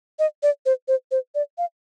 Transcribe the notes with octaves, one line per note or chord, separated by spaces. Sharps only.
D#5
D5
C5
C5
C5
D5
F5